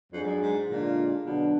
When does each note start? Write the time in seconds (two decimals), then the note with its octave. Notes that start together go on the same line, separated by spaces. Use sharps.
0.13 F2 F#3 D4 G#4
0.23 G#2
0.27 F#2
0.41 G#2
0.68 A#2 D3 G#3 D4 F4
1.24 B2 D3 F#3 B3 D4